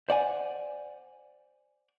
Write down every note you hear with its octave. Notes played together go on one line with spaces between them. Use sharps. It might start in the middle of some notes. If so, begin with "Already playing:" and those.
C5 D5 F#5 G#5